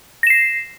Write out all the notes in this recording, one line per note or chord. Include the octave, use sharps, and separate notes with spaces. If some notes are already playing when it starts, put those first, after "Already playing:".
A#6 C7 E7